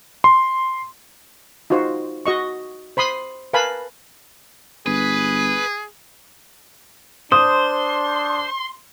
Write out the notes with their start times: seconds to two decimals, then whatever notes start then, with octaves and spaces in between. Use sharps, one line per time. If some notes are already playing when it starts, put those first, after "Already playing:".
0.24 C6
1.70 D#4 F4 F#4 C5
2.26 F#4 D#5 C#6
2.97 C5 B5 C6 D#6
3.53 A#4 B4 F5 G#5 A5 B5
4.86 G1 G#4 B4
7.32 D4 C5 C6 D#6